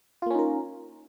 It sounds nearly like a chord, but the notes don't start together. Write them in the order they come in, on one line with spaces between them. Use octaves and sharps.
F4 A#3 C#4 D#4 A#4